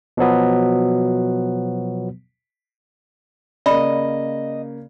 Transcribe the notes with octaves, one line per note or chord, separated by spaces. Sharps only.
B2 F3 F#3 B3
C#3 A#3 D5 D#5 B5